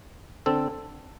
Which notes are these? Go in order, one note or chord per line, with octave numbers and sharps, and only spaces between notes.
D3 C4 A4